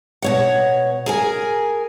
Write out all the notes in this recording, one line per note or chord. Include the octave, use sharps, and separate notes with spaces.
B2 C#5 F#5
G#4 A#4 G#5